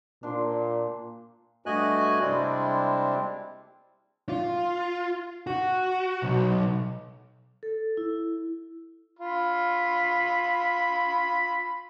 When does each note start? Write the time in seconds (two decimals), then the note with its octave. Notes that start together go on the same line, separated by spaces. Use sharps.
0.23 A#2 D4 C5
1.66 G2 A3 F#4 D#5 G#5 F#6
2.21 C3 G3 G#3 C4 D4 E4
4.29 F4
5.47 F#4
6.22 B1
7.63 A4
7.97 E4
9.19 F4 B5